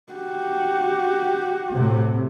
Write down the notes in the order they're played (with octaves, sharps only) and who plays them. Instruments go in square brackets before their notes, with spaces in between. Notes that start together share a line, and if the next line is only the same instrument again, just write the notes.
[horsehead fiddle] F#4 G4
[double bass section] A2 C3